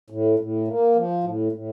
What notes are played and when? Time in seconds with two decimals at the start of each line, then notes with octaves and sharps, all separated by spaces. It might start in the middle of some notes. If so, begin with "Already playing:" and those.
0.10 A2
0.39 A2
0.68 A#3
0.96 F3
1.24 A2
1.52 A2